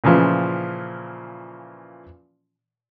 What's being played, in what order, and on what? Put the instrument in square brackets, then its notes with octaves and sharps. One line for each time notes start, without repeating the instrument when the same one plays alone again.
[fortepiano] A#2 C#3 E3 F3